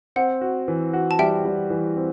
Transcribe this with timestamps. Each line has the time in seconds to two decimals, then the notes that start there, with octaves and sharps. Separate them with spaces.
0.16 C4 F#5
0.41 F#4
0.68 E3
0.93 F#4
1.11 A5
1.19 G3 E5 G5
1.45 G3
1.70 E3
1.97 C4